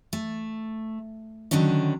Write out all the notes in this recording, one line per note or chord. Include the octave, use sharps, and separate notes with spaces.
A3
D3 D#3 F#3 C#4 D4